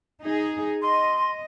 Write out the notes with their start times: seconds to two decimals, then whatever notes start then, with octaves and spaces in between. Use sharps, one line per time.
0.21 D#4 G#4
0.82 D#5 C6